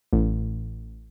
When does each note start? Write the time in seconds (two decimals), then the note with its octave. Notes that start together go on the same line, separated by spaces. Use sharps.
0.13 A1